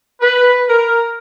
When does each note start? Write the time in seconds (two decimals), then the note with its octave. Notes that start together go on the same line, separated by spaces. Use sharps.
0.21 B4
0.69 A#4